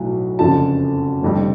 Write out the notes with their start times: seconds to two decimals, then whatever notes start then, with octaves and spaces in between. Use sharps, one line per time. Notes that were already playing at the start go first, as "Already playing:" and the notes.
Already playing: B1 A2 F#3
0.39 F#1 F2 D3 F3 A5
1.22 F1 F2 D3 G3